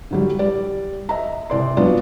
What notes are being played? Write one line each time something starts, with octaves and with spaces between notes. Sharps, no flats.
D3 F#3 G3
G3 D5
D#5 E5 A#5
C2 D5 C6
F#3 B3 D4 F4